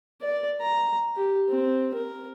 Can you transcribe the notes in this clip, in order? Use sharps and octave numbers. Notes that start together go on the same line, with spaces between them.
D5
A#5
G4
C4
A#4